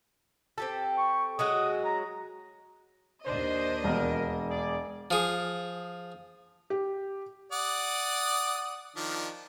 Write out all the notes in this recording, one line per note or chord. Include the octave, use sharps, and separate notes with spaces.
C4 G4 A4
C#6
F#3 G#3 F#4 D#6
A#5
D#2 D4 C5 D#5
E1 A#4
G#4 D5
F3 G#4
G4
D5 F#5 D#6
D#3 F3 D4